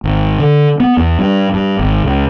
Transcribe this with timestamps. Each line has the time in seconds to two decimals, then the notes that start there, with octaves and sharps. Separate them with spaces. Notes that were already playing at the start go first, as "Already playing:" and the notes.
0.04 G#1
0.39 D3
0.80 B3
0.97 E2
1.19 G2
1.54 G2
1.79 G#1
2.04 C#2